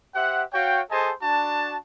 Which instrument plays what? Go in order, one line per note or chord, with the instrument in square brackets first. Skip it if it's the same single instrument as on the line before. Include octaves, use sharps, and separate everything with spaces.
[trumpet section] G4 C5 E5 F#5
F#4 C#5 F5 G5
G#4 A4 C5 D#5 G#5 A5
D4 F#4 A5